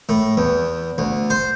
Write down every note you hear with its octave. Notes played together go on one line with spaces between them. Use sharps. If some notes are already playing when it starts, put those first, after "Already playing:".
A2
E2
D2
C5